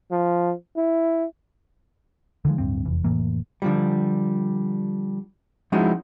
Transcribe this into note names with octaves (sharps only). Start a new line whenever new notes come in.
F3
E4
D3 D#3 F3 G#3
D1 G1 G2 C4
F1 E2
F1 A2 E3 A#3
D3 F3 G3
F3 G#3 C#4 D#4 E4 F#4